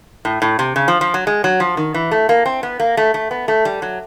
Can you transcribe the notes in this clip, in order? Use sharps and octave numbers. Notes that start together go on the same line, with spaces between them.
A2
A2
C3
C#3
F3
F3
F#3
G#3
F#3
F3
D#3
E3
A3
A#3
C4
B3
A#3
A3
A3
B3
A3
G3
F#3